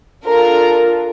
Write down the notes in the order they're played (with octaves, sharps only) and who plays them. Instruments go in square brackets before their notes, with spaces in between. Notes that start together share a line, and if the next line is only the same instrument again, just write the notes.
[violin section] D4 F4 A4 A#4